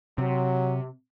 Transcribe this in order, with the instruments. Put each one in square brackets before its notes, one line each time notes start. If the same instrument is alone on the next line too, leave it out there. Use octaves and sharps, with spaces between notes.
[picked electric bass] C3 [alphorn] F#3